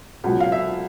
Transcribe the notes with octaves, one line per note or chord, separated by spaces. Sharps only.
C#2 B2 F#3
F5
E5